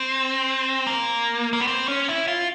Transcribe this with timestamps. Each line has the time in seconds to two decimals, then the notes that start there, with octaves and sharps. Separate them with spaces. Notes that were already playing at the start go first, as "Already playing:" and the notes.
Already playing: C4
0.87 A#3
1.53 A#3
1.60 B3
1.67 C4
1.88 C#4
2.09 E4
2.28 F4